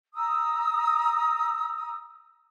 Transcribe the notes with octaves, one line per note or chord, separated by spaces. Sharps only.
A#5 D#6 E6